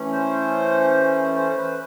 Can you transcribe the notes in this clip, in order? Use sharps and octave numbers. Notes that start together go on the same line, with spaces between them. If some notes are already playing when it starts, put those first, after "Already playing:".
Already playing: E3 A3 C#4
C5
C5
B4